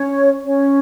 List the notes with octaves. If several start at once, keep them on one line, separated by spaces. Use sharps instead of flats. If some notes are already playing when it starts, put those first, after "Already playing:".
Already playing: C#4 C#5
C#4 C#5